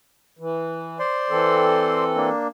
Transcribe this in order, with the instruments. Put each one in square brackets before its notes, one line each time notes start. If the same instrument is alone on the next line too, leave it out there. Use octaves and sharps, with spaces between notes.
[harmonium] E3
[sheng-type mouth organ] C5 D5 C6
[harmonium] E3 C4 A4
[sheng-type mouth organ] A#3 D4